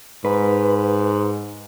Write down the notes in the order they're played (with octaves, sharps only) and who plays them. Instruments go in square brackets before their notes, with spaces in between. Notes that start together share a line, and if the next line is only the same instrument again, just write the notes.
[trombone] G#2 [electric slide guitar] B4